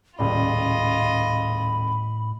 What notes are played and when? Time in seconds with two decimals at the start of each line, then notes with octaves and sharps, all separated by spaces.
0.19 D#1 C#2 A2 F4 D5 D#5 B5